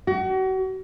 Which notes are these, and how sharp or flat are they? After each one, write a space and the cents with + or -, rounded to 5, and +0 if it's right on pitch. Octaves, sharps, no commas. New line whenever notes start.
F#4 +35